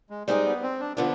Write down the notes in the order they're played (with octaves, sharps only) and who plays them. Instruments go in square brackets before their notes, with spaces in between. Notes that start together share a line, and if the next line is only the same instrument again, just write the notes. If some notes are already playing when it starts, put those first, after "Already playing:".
[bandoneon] G#3
[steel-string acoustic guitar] G3 C4 D#4 G#4 [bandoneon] G#3
[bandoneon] B3
C4
D4
[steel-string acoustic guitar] D3 F3 B3 F4 [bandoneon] D4